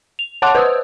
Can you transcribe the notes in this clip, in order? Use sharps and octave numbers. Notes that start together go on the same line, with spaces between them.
F7
C#5 F#5 A5 C6 D6 F#6
B4 C5 D#6 E6